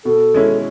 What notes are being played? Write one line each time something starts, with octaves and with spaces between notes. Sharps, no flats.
B2 A4
G#3 C#4 E4